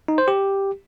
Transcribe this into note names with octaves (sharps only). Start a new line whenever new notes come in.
D#4
C5
G4